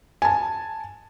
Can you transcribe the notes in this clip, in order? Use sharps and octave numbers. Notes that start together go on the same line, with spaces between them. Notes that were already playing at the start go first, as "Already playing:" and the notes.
G#5 A5